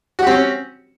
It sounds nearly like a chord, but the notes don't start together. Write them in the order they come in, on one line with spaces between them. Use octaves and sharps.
F#4 G4 C4 C#4